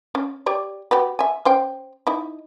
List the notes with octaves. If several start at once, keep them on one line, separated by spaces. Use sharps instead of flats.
C#4
G4 C#5 D5
F#4 G4 B4
E5 G#5
C#4 C5 G5
D#4 E4